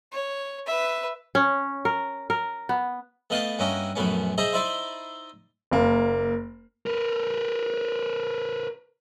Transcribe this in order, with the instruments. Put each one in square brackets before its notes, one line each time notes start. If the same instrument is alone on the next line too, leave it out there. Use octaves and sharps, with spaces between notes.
[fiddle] C#5
B4 E5
[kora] C#4
A#4
A#4
B3
[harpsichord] A3 B3 D#5 F5 G5 A5
G2 A#3 C#4 F#4 D#5 E5
A#1 F#2 A3 B3 C#4
G#4 C5 D#5 E5 A5 A#5
D#4 E4 C5 D5 E5 C6
[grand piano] F#1 A#3
[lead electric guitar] A#4 B4